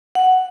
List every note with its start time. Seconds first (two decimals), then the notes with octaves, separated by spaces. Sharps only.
0.15 F#5